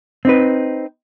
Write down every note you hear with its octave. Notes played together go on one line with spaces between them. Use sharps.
C4 D#4 B4